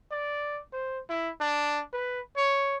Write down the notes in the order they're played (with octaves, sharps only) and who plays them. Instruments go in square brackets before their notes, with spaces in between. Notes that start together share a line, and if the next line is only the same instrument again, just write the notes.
[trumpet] D5
C5
E4
D4
B4
C#5